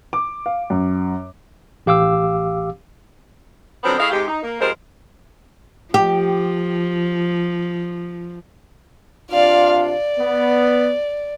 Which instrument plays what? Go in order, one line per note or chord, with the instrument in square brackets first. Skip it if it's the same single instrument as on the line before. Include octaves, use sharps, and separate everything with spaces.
[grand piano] D6
F5
F#2
[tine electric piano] A1 G4 F5 D6 E6
[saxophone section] D3 F3 F#3 B3 C4
A3 E4 G#4 D#5 F5
G#2 C3 G#3 G4
D#4
A#3
F3 G3 G#3 C4 A#4 C5
[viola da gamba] F3 [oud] G4
[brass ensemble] C3 D4 F4 [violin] D5 F5
[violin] D5
[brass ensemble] B3